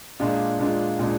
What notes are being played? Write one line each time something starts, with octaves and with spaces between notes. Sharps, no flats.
A#2 G#3 D4 F4
A#2 G#3 D4 F4
A#2 G#3 D4